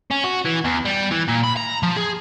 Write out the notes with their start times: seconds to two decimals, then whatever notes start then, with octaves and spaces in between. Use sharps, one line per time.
0.11 C#4
0.24 F#4
0.46 E3
0.65 E2
0.85 G3
1.11 E3
1.28 A#2
1.44 B5
1.57 A#5
1.83 F3
1.97 G#4